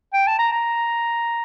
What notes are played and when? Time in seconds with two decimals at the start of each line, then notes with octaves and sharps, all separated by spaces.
0.14 G5
0.27 A5
0.39 A#5
0.52 A#5